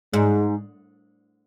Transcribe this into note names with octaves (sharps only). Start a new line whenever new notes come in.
G#2 G#3